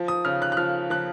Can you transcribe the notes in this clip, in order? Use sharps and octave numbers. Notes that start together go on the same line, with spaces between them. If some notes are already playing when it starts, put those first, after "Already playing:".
Already playing: F3
D#6
C#3 F6
F#6
F#6
F3 F6
F3 F#6